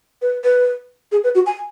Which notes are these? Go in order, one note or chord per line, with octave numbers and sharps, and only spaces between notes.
B4
B4
G#4
B4
F#4
G#5